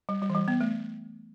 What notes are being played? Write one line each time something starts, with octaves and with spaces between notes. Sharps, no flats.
G3
G3
E3
G3
B3
A3